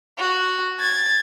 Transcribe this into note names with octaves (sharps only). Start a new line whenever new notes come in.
F#4
G#6 A6